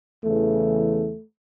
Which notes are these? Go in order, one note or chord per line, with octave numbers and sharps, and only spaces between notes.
E2 C#3 E3 A3